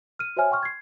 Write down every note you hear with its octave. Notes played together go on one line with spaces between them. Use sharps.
F6 D#7
F#4 C5 C#5 E5 G#5 F6
G5 C6 C#6 F6
G#6 C7